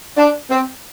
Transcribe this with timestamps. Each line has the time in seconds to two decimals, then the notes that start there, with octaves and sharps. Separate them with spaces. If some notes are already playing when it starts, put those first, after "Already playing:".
0.17 D4
0.50 C4